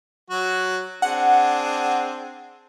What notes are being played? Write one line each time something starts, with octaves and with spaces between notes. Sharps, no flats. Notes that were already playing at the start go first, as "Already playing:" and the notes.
F#3 F#4
C4 D4 G#4 F#5